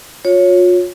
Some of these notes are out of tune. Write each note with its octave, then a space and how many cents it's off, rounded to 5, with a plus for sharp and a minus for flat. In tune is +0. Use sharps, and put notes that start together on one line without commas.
F4 +40 C#5 +0